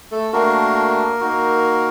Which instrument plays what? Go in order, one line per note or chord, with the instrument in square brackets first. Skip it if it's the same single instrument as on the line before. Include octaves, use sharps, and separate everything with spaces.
[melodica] A3 A4
A3 A#3 D4 F#4 A#4
A#3 D#4 F#4